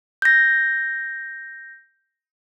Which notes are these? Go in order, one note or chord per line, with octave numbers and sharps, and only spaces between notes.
G6 A#6